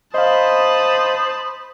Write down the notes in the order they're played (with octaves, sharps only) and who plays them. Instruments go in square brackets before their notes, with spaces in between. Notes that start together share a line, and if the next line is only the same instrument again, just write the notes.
[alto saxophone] C5 [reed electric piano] D#5 F5 [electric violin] A5 B5 [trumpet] D#6